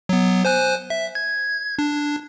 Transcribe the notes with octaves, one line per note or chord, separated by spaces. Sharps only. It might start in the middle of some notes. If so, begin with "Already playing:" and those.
F#3 B3
C5 G#5 F#6
E5
G#6
D4